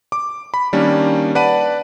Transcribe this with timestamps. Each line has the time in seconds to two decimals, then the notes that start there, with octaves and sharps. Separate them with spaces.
0.12 D6
0.54 B5
0.73 D#3 G3 A#3 C#4 D4
1.35 B4 D5 F#5 A5 B5 D#7